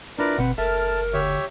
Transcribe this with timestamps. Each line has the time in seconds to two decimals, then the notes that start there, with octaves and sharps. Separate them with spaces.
0.19 D4 E4 F4 A#4 B4 D5
0.38 G1 B2 C4 B4 F#5
0.58 F#1 A4 A#4 E5 A5 F6
1.13 D2 G4 C#5 E5